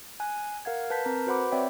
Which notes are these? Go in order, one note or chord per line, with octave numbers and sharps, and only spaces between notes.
G#5 F#6
A#4 F5 F#5 G#6
B4 A5 G6 B6
C4 A#4 A#5
F#4 B4 C5 F#5 B5 D6
C4 C#5 D5 E5 G5